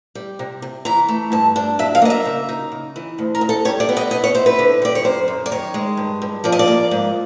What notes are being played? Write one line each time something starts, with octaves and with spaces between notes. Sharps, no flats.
G3
C3
C3
E3 A#5
A3
G2 A5
D4
F#3 E5
F5
A#3 D#5
E5
C#3
D#4
C#3
E3
D2
A#4
D2
A4
G3 C#5
D5
B3
D#5
B2 D#5
C#5
E4 C5
B4
D3
G3 D5
C#5
F#2 C5
F#2
D5
D#3 C#5
G#3
G2
G2
F3 D5
D#5
D5
A#3
G#2